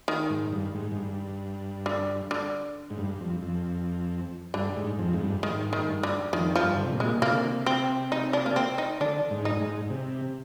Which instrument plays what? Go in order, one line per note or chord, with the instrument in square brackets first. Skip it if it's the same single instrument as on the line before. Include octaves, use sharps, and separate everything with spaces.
[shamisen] D#3
[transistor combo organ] G#2
G2
G#2
G#2
G2
[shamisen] D3
D3
[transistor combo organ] G#2
G2
F2
F2
[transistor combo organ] G2 [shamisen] D3
[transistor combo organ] G#2
F2
G#2
G2
[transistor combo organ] G#2 [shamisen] D#3
[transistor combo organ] G#2 [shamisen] D#3
[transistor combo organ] G2
[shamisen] D3
[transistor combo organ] F2 [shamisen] D#3
[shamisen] F3
[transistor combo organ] G2
D3
C3
A#2
[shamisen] G#3
[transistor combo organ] C3 [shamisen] A#3
[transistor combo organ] D3
C3
[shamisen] C4
D#4
D4
A#3
C4
D#4
[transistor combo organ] D3 [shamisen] D4
[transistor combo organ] G#2
[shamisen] D#4
[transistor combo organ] G#2
C3